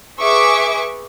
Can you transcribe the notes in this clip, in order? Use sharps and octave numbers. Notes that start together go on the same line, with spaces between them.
G#4 B4 E5 C#6 D6